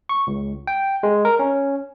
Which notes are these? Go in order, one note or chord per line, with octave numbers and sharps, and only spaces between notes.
C#6
C#2
G5
G#3
A#4
C#4